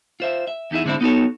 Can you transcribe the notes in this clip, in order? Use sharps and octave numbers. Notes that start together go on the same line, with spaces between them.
F4 C5 E5
E5
E2 D#4 E4 G#4 E5
G#2 D3 G#3 C4 D4 E4
B3 D#4 F#4 G#4 A4 C#5